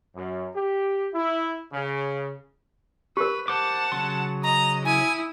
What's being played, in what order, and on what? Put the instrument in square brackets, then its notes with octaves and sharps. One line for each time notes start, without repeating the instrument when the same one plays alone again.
[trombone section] F#2
G4
E4
C#3
[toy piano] G4 A#4 [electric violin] B4
[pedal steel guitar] C5 D6 [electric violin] F#5 A5
[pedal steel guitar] C#3 F#3 C6
[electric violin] D#5 [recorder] A#5
[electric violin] E4 D#6 [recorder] G#5